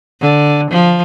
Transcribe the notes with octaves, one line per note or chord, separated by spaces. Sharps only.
D3
F3